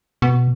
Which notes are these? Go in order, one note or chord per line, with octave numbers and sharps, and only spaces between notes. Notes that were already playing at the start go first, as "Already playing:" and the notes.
B2